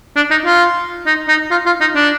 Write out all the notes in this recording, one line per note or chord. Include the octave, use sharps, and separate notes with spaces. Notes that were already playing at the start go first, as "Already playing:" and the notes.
D4
D#4
F4
D#4
D#4
F4
F4
D#4
D4